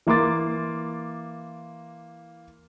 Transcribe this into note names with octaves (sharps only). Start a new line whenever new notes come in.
E3 A#3 C6 D6 A6